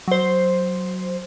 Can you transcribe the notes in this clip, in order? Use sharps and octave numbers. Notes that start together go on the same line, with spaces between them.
F#3 C5